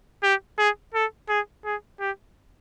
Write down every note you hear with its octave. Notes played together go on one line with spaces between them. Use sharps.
G4
G#4
A4
G#4
G#4
G4